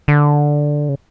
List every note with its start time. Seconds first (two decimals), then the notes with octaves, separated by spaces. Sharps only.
0.08 D3
0.89 C#3